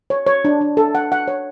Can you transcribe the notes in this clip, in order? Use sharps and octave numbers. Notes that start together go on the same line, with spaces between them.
C#5
C#5
D4
D4
A4
F#5
F#5
C#5